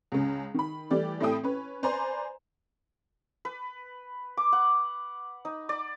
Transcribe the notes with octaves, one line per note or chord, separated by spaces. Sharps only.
C#2 C#3
D#3 B5
E3 G3 A3 G4 D5
A2 C4 E4 A4 G5 D#6
C#4 B4
B4 C5 D5 G#5 A#5 C6
B4
D6
F#5
D#4
D5